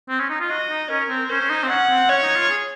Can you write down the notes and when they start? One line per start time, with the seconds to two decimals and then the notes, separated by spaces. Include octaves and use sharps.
0.09 C4
0.20 C#4
0.30 D#4
0.40 F4
0.50 F#4 D#5
0.70 D#4
0.90 C#4 A#4
1.09 C4
1.29 C#4 C5
1.42 C#4
1.50 D#4
1.63 C4
1.69 C#4 F#5
1.89 C4
2.09 C#4 C#5
2.23 D#4
2.36 F4
2.49 G#4